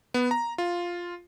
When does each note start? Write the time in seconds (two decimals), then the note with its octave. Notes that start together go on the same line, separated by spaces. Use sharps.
0.14 B3
0.31 A#5
0.58 F4